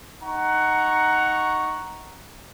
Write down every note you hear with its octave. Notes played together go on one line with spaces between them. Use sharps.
D#4 F#5 A#5 C#6